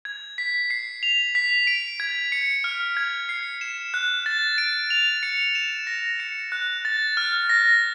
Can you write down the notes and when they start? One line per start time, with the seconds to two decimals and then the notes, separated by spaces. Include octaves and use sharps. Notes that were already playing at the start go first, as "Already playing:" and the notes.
0.05 G#6
0.38 B6
0.70 C7
1.03 F7
1.35 B6
1.67 D7
2.00 G#6
2.32 C#7
2.64 F6
2.97 G#6
3.29 C7
3.61 E7
3.94 F#6
4.26 A6
4.58 D7
4.90 F7
5.23 C#7
5.55 E7
5.87 A#6
6.20 C#7
6.52 F#6
6.85 A6
7.17 F6
7.49 A#6